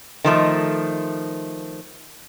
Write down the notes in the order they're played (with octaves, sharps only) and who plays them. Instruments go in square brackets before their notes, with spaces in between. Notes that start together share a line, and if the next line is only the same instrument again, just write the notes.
[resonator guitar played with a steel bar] D#3 F3 A3